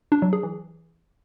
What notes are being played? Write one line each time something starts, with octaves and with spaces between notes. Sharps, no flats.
D4
F#3
G#4
E3